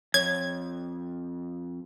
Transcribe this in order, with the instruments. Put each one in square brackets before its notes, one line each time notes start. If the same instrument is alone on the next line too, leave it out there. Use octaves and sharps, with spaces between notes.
[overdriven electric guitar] F2 [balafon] C#5 [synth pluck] G#6